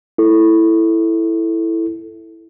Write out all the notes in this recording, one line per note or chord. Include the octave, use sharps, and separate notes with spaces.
E4 A4